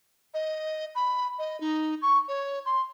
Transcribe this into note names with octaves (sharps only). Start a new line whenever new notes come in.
D#5
B5
D#5
D#4
C#6
C#5
C6